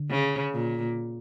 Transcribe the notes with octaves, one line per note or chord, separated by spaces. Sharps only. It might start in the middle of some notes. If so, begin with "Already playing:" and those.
Already playing: D3
C#3
A#2